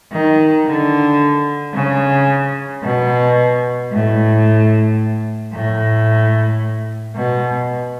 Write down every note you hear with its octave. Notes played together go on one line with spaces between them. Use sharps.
D#3
D3
C#3
B2
A2
A2
B2